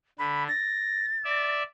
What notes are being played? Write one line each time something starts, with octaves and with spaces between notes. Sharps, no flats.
D3 B5
A6 A#6
D5 E5